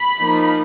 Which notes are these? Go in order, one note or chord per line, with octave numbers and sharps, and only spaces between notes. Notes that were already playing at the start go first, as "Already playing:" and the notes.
Already playing: B5
F3 A#3 D#4